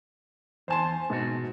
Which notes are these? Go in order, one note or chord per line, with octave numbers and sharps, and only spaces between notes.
E2 C5 G#5 A5 C6
G#2 B2 F#4